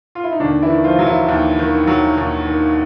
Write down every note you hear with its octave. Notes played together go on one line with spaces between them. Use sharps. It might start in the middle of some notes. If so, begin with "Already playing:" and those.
F4
E4
D#4
D#2 D3 D4
E3 E4
D#3
F3 F4
F#3
E3 E4
D#2
D#3
F#3
D#2
D#3